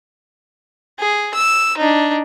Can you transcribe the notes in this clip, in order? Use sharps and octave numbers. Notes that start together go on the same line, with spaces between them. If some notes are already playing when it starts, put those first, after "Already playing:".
G#4
E6
D4 D#4